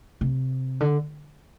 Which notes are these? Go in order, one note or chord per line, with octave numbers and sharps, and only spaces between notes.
C3
D3